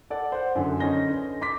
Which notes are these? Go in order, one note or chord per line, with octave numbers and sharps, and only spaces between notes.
A4 D5 F#5
C5 F#5
F#2 D3
D3 C#4 D#4 C6 A#6 G7
B4
C6 D6 B6